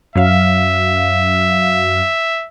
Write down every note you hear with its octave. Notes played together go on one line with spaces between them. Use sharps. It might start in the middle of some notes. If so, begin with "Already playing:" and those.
F#2 F#3 E5 F5